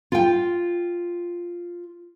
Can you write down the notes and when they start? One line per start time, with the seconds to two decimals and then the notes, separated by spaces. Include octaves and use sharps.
0.12 F4 G5